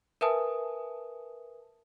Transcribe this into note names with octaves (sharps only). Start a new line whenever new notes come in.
A#4 B4 E5 G#5 A5 D#6